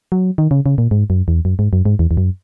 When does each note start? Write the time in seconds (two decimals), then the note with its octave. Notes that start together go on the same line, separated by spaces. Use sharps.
0.12 F#3
0.38 D#3
0.51 C#3
0.66 C#3
0.78 A#2
0.91 G#2
1.10 F#2
1.28 E2
1.45 F#2
1.59 G#2
1.73 F#2
1.85 G#2
1.99 E2
2.11 E2
2.17 F#2